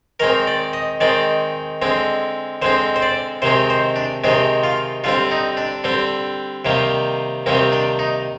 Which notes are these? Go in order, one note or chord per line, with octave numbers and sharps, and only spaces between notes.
D#3 G#3 C4 A#4
D5
D#5
D#3 G#3 C4 D5
D3 G#3 C4
D3 G#3 C4 C5
C5
D5
C3 D#3 G#3 C4 C5
C5
D4
C3 D#3 G#3 C4 D4
F4
D3 G3 C4 F4
D#4
D4
D3 G3 C4
C3 D#3 G3 A#3
C3 D#3 G3 A#3 C4
D4
D#4